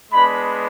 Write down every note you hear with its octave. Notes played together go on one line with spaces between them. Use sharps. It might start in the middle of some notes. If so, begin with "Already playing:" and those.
G#3 B3 D4 B5